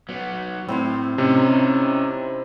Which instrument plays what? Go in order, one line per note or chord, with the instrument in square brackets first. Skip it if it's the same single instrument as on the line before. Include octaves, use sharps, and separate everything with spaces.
[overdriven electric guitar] F#3 B3
[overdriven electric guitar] A2 [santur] C4 E4 C5
[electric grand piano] C3 [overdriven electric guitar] C#4 D#4